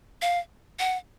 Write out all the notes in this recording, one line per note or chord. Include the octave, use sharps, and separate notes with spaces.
F5
F#5